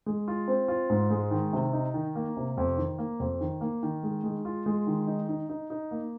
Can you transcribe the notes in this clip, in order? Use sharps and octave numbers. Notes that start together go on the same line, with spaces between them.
G#3
F4
C4
F4
G#2
G#3
D#3
C3
D#4
D#3
A#3
C3
F2
D#3
A#3
F2
D#3
A#3
D#3
G#3
G#3
F4
G#3
D#3
D#4
D#4
D#4
D#4
A#3